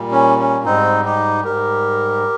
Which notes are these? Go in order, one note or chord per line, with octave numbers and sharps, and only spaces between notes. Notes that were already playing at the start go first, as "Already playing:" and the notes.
Already playing: A#2 G3
C#4
C#4
G#2 G3 C4 D#4
D#4 G4
G#2 G3 G4 A#4